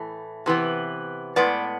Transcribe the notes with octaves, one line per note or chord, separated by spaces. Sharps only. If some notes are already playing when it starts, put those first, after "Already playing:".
Already playing: A2 E3 A3
C3 E3 B3
A2 G#3 B3 D5